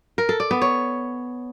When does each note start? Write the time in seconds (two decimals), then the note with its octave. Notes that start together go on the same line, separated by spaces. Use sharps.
0.18 A#4
0.29 A4
0.40 D5
0.51 B3
0.62 C#5